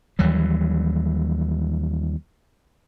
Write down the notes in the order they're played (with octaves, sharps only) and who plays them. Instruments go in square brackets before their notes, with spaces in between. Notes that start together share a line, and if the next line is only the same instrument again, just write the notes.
[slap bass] D#2 E3 F#3 G3